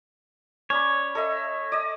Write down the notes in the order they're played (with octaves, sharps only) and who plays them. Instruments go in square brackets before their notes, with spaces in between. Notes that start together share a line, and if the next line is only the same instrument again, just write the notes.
[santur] C#4 D5 B5 [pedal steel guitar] C#5
[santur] A4 D#5 E5
D5 D#5